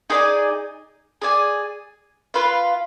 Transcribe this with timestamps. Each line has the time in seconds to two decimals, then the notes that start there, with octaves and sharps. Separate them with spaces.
0.10 D#4 G#4 D5 G#5
1.22 G#4 D5 G#5
2.34 F4 B4 F5